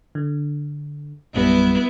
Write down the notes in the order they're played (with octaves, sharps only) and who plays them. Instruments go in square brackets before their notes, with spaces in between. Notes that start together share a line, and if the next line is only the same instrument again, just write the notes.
[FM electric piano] D3
[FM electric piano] A#1 F#2 G3 [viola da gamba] B3 E4